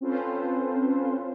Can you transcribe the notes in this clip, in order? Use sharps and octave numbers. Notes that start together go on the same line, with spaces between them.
C4 C#4 F4 A4 B4 C5